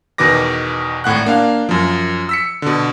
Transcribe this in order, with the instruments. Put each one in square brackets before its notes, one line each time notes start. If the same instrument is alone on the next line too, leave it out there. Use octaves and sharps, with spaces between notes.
[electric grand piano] E2 B2 D#3 B4 D6 A#6
G#1 A2 F#5 F#6
A#3 D4 F5 F6
F#2 F3
E6 B6 C#7
B2 D3